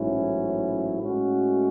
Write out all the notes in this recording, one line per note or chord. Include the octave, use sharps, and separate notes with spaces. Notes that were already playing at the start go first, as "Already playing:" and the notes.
Already playing: A1 G#2 F#3 C#4 E4
A2 G#3 C#4 F#4